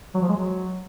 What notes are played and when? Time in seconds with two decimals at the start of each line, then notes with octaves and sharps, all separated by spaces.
0.15 F#3
0.22 F3
0.29 G#3
0.36 F#3